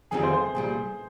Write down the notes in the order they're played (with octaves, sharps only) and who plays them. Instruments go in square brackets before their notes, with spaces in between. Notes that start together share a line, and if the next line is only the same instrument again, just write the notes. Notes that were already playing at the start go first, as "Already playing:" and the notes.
[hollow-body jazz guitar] F2 D#3 G3 C4 F4 [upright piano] G#4
[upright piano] C5
C5
[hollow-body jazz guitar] C2 A#2 G3 [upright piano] G#4